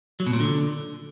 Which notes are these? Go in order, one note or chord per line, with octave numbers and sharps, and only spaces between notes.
F#3
B2
A#2
D3